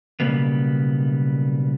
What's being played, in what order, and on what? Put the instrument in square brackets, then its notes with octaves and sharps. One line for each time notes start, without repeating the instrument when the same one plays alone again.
[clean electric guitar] B1 G2 C#3 G3 A#3 B3